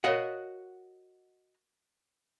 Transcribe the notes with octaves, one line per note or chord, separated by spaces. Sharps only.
F#4 A#4 C#5 D#5 F5 F#5